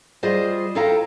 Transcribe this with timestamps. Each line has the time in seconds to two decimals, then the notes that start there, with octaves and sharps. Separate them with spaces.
0.23 G3 F4 G#4 C5 D#5
0.75 E4 F4 A4 F5 G5 A#5